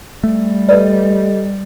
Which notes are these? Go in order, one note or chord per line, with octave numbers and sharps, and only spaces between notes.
G3 A3
G4 A4 B4 D5 D#5